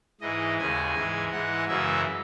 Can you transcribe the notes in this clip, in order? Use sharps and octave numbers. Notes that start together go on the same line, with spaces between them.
G#2 E3 G#3 D#5
D#2 C#3 G#3 G#5
G#2 E3 G#3
G#2 E3 G#3 F#5
F#2 C#3 E3 G#3 E5